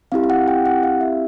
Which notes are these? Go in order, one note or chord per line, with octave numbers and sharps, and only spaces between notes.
C4 E4 G4 F5
F5
F#5
G5
F#5
F5
E5